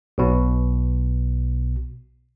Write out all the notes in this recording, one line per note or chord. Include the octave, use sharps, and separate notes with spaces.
B1 B2